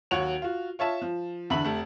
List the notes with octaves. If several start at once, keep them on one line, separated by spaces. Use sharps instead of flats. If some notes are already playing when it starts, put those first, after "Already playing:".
D#2 F#3 F#4 C#5 F#5 F7
F4 F#4
F4 C#5 E5 A5 E7
F3
E2 D3 E5 B5 F#7
F1 A3